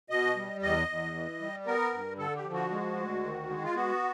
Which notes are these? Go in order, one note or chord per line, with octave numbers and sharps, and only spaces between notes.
B2 D#5
G3
E2 D#5
E2
E3
G3
B3 A#4
G2
D3 A4
G4
F3
F#4
G#3
D2
D#3
G#3
F4
B3 F#4